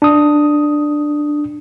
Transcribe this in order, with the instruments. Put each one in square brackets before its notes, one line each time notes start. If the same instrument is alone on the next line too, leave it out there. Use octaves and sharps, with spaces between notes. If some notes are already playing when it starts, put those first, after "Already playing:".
[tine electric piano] D4 D#6